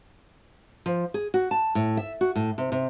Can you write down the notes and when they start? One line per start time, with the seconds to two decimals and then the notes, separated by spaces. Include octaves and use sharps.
0.86 F3
1.14 G#4
1.34 F#4
1.51 A5
1.75 A2
1.97 E5
2.21 F#4
2.36 A2
2.58 C3
2.72 C3